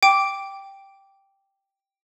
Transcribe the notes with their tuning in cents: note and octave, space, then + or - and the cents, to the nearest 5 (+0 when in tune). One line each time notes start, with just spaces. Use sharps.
G5 +0 D6 -10